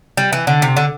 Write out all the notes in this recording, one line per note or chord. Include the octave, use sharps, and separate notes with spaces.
G3
E3
D3
C3
D3